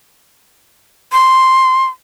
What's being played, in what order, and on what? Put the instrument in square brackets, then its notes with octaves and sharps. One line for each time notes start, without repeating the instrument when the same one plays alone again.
[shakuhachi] C6